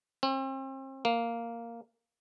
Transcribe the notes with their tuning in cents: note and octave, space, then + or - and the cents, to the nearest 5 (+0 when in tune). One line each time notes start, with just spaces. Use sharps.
C4 +40
A#3 -5